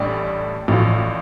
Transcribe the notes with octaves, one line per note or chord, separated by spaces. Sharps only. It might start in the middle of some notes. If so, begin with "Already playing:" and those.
Already playing: A1 A2 G3 D4
A1 A2 F3